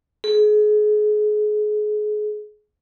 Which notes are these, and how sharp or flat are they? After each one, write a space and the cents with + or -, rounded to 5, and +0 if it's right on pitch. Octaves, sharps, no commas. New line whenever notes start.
G#4 +30